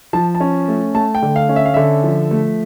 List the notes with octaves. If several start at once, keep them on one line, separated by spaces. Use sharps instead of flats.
F3 A5
A5
C#4
A3
A3 A5
G5
D3
F5
C#4
E5
F5
D3 E5
F3
A3